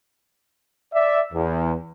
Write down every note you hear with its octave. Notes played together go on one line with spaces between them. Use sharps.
D5 E5
E2